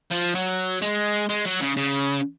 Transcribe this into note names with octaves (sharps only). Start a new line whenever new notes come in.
F3
F#3
G#3
G#3
F#3
C#3
C#3